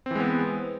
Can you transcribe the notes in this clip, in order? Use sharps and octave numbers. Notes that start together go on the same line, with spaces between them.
E3 G#3 B3 C4